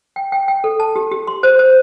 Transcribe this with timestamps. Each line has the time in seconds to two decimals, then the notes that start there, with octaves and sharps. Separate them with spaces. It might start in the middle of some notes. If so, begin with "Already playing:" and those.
0.16 G5
0.32 G5
0.48 G5
0.64 A4
0.80 A5
0.96 G4
1.12 G4
1.27 C6
1.43 C5
1.59 C5